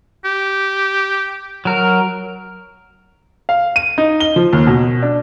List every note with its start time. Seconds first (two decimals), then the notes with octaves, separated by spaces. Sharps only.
0.25 G4
1.65 F#3 A#4
3.49 F5
3.76 D#7
3.98 D#4
4.20 G7
4.36 F3
4.53 D#2
4.67 B2
5.03 D4